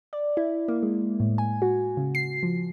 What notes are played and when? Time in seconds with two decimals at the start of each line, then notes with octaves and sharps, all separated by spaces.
0.13 D5
0.37 E4
0.68 A#3
0.83 G#3
1.20 A2
1.38 G#5
1.62 F#4
1.97 C#3
2.15 C7
2.43 F3